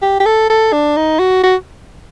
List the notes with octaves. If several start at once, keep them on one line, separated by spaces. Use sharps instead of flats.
G4
G4
A4
A4
D4
D#4
F#4
F#4